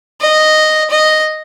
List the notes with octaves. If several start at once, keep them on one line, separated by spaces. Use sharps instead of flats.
D#5
D#5